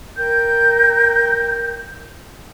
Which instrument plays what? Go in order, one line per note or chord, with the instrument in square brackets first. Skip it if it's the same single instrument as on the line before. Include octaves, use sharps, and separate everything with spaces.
[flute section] A#4 G5 G6